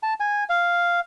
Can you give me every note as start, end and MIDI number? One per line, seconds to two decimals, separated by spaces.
0.03 0.14 81
0.20 0.44 80
0.49 1.00 77